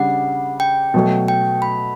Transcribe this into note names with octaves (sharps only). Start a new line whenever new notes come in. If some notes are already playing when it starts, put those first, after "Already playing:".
Already playing: C#3 G3 D4 F#5
G5
B2 F#3 A3
G5
B5